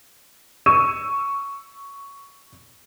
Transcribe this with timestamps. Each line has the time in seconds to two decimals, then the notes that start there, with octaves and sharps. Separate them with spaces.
0.66 C#6 E6 D#7 E7